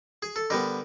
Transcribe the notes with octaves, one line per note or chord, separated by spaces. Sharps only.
G#4
A4
D3 G3 B3 A#4